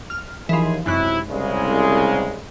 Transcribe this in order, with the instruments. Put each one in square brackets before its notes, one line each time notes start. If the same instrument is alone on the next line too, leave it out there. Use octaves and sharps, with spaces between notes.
[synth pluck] F6
[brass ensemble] D#2 G#4 [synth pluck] E3 F3
[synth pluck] G#1 F#2 F#6 [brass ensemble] C3 E4
[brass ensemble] C2 C#3 G#3